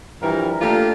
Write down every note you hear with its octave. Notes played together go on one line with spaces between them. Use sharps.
G2 E3 F3 G3 A#4
A3 A#3 D4 F4 G4 A#4